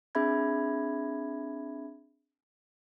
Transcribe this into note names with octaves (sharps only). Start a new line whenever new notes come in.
C4 D4 G#4 E5 B5 G#6